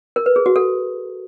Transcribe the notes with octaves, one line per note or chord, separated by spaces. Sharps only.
A#4
B4
G#4
F#4
A4